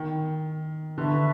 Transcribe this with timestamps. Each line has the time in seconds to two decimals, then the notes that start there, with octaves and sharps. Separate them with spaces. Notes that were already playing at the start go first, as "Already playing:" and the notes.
Already playing: D#3
0.97 D3 B4 E5 A5 C#6